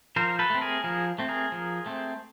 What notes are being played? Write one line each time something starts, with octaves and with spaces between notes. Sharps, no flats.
F3 A#4 C5
A4 B4
A3 C4
G#4 A#4
F3 G#4 A#4
A3 C4
G#4 A#4
F3
A3 C4